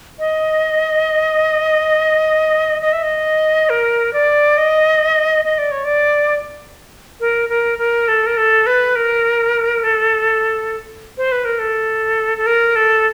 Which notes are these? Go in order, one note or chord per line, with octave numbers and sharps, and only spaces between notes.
D#5
D#5
E5
D#5
A#4
D5
D#5
D#5
D5
C#5
D5
A#4
A#4
A#4
A4
A#4
A4
B4
A#4
A4
C5
B4
A#4
A4
A4
A#4
A4